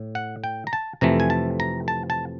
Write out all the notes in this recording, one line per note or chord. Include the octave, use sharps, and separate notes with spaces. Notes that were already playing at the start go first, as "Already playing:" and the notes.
Already playing: A2
F#5
G5
A#5
A5
F2 C3 E3 A3 A#5
G#5
A5
A#5
A5
A5